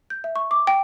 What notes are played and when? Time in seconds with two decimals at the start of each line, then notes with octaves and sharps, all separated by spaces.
0.10 G6
0.24 E5
0.36 C#6
0.51 D6
0.67 G5